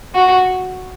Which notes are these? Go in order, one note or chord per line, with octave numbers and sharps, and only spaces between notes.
F#4